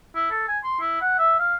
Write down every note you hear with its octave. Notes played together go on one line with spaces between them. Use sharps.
E4
A4
G#5
C6
E4
F#5
E5
F5